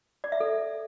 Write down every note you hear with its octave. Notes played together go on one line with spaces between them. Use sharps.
D5
E5
A4